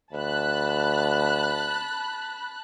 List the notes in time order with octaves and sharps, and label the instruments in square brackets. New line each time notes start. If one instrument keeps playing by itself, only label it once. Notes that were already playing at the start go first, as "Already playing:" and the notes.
[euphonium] D2 [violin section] A5 B5 F#6